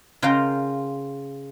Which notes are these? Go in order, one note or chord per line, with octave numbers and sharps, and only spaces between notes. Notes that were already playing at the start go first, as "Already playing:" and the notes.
C#3 F4 A#4 F5 G5 A#5